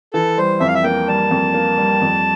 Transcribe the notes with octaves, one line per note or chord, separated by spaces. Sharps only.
E3 A4
G3 C5
F2 E5
F5
E5
A#3 G5
G3 A5
F2
A#3
G3
F2